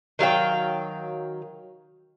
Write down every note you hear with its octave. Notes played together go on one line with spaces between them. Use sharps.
D#3 F#3 F5 G5